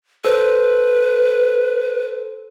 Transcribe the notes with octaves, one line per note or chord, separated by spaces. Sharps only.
A4 B4 C5